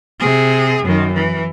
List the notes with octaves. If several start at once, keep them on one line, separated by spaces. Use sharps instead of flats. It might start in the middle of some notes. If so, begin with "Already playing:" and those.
C3 G#4
F#2 D#3
E3